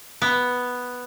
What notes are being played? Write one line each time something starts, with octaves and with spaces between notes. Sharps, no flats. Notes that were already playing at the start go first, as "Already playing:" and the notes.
B3